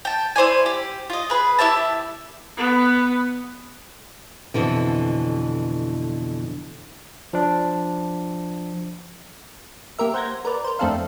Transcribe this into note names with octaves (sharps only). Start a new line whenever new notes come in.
G5 A5
E4 C5 D5 G#5
G4
F4 D#5
G#4 B4
E4 G4 E5 A5
B3
F2 B2 D3 E3
F3 D4
A#3 G4 A#4 E5
C5 F#5 G6 G#6 A#6
A#4 B4 D5
A#4 C5
F2 A3 C4 D4 A4 F5